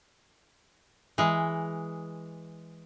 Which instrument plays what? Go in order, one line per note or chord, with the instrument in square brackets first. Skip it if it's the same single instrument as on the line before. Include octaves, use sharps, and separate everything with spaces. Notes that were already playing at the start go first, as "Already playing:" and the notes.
[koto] E3 G#3